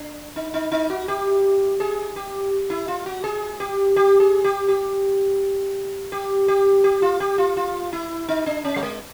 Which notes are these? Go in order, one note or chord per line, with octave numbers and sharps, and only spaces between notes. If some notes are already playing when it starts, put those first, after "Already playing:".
Already playing: D4
D#4
D#4
D#4
F#4
G4
G#4
G4
E4
F4
F#4
G#4
G4
G4
G#4
G4
G4
G4
G4
G4
F4
G4
F4
F4
E4
D#4
D4
C#4
G3
G#3